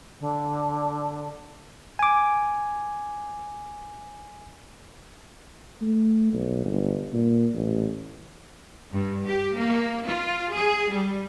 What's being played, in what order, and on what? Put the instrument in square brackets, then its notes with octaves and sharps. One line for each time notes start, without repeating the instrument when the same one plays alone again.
[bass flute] D3
[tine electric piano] G#5 D6
[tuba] A3
B1
G1
A#2
A1
[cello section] G2
G4
A#3
F4
G#4
G3